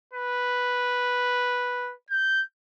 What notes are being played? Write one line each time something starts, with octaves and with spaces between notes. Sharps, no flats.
B4
G6